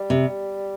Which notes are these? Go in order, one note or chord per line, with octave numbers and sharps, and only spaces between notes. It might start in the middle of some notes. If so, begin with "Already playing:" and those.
Already playing: G3
C3